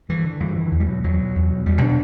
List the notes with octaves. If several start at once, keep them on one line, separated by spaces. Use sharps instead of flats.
G2 E3
D3
G2 E3
D3 E3
E2
G3
B2 F#3
E2 F#3
B2
E2
B2
E2 G3
B2 D4